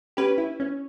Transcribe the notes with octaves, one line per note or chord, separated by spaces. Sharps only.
C#4 G4 B4
E4
C#4